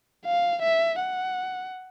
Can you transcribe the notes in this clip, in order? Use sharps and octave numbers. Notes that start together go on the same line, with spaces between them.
F5
E5
F#5